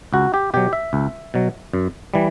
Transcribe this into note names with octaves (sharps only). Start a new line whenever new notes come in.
C#2 F#4
G4
B2 F#3 G4
E5
C#2
B2 F#3
F#2
E3 G3